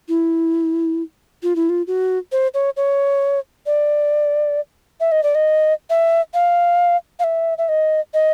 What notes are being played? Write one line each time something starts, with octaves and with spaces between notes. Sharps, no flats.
E4
F4
E4
F4
F#4
C5
C#5
C#5
D5
E5
D#5
D5
D#5
E5
F5
F5
E5
E5
D#5
D#5